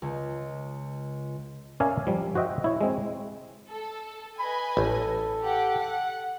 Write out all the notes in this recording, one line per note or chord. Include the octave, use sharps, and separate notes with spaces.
C#2
C#4 A#4 D5 E5 F5 G#5
F3 G3
F#4 C5 D#5 E5 G5
E4 C#5
G#3 C4
A4
B4 D#5 G#5 B5
A1 A4
G4 F#5
F#5